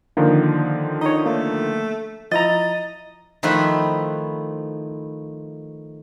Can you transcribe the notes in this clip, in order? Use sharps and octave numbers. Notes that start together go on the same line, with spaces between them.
D3 D#3 F3 A#3
D#4 C#5 D#5
A3 A#3
F3 E4 D#5 A#5 A6
D#3 F3 A3 E4 B4 C5